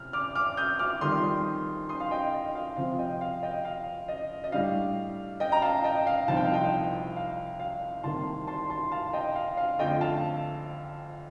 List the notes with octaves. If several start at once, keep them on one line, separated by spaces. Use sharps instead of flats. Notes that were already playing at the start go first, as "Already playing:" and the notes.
Already playing: C3 F6
D6 F6
D6 F6
D#6 G6
D6 F6
F2 D#3 G3 C6 D#6
C6 D#6
F5
D#5 G5
D#5
F5
C3 F3 C4 F5
D#5 G5
F5
D#5 G5
F5
D#5
D#5
A2 G3 D4 F5
D#5 G5
A#5
F5 A5
D#5 G5
F5
C2 A#2 F3 C4 D#4 A5
G5
F5
D#5 G5
F5
F5
C2 C3 D#3 A#3 A5 C6
A5 C6
A5 C6
F5 A5
D#5 G5
F5
F5
F2 D3 A3 D#5 G5
F5 A5